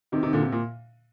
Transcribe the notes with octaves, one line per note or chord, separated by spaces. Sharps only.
C3 D#3
C3 D#3
A#2 D3
C3
A#2